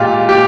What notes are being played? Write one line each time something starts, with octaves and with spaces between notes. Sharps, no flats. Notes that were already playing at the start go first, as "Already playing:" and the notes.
Already playing: A#2 G#3 F4 G4
A#2 G4